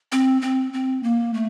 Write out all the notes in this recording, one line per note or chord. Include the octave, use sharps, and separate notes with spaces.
C4
C4
C4
A#3
A3